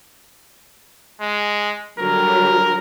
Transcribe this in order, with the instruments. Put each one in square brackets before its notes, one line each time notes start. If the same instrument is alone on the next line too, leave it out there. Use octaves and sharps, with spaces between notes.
[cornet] G#3
[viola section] D3 F#3 G3 [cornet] A#4